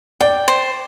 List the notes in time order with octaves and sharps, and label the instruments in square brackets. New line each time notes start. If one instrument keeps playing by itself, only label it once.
[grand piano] D5 [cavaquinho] G5
[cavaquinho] C5